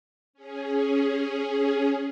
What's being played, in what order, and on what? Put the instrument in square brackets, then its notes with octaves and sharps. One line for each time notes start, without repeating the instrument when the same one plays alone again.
[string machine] C#4 G#4